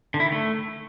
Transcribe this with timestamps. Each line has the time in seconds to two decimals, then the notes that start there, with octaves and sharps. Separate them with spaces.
0.14 D3
0.20 E4
0.26 D#3
0.32 A3